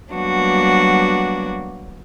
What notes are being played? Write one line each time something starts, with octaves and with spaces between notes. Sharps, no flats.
F#3 G3 A#3 B3 D4 F#4